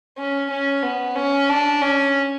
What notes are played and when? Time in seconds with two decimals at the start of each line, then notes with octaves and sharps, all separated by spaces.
0.18 C#4
0.50 C#4
0.83 B3
1.16 C#4
1.49 D4
1.82 C#4